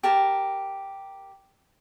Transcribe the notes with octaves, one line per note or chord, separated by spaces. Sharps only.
G4 A#4 A5